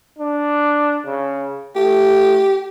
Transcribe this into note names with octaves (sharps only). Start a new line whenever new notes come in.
D4
C#3
A3 G4